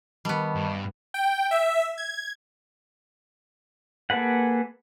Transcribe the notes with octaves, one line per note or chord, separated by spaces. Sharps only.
D#3 G3 B3 D#5 A5 C#6
G2
G5
E5
G#6
A#3 G#4 A4 B4 F#5